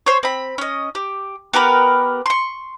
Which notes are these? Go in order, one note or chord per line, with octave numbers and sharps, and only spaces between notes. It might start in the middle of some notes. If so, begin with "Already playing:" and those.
C5 C#5
C4 B5
C#4 D#5
G4
B3 G4 A#4 B4
C6 C#6